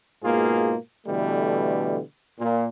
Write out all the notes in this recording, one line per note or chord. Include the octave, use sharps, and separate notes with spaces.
G#2 B2 A#3 F4 G#4
B2 D3 E3 G3 A3
A#2